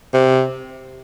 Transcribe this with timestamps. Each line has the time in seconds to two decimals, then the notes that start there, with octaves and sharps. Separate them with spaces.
0.14 C3